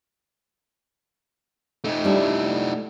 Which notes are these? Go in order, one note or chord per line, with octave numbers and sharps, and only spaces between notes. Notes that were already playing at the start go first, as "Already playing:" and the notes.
A3 D#4
G3 D4 E4